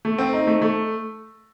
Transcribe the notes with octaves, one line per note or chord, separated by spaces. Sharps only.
A3
C4
D#4
A3
A3